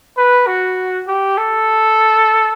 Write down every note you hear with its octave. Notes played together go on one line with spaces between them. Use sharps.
B4
F#4
G4
A4